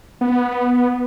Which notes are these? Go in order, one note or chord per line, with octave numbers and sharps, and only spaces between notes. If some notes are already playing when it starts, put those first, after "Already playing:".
B3